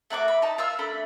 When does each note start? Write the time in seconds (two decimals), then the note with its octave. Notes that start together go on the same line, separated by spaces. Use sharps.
0.10 A3 F#4 A5 D6
0.28 B5
0.42 D#4 A5
0.58 F4 E5 E6 F6
0.79 A3 D4 B5